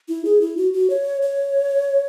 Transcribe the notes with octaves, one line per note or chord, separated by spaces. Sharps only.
E4
G#4
E4
F#4
F#4
C#5
C#5